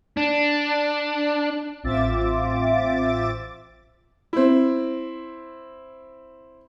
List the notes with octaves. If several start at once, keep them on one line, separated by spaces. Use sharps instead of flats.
D4
A1 C4 F4 E5 D6 A6
C4 E4